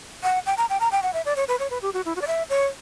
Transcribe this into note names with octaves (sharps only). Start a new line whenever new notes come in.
F#5
G5
A#5
G5
A#5
G5
F#5
E5
D5
C#5
B4
C#5
B4
G4
F#4
E4
F#4
D5
E5
C#5